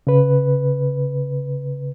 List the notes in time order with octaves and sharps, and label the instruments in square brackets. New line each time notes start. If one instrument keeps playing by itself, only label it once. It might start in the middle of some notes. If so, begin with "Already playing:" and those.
[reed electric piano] C#3 B4